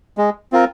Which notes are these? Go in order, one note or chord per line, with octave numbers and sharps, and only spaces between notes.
G#3
C4 F4 A#4